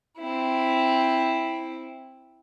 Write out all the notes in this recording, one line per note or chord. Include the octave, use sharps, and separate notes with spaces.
C4 E4